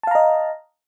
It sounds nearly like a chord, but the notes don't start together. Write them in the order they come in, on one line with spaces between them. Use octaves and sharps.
A5 F5 A#5 D#5